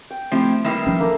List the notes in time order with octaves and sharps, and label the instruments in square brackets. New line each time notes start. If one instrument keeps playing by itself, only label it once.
[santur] G5
[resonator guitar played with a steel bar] F3 E4 G4 [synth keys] A3 C4
[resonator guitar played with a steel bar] D#3 G3 A#3 [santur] E4 B4 [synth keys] C7 E7
[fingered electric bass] F3 C#4
[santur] A#3 A4 A#4